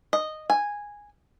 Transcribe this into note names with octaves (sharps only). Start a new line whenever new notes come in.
D#5
G#5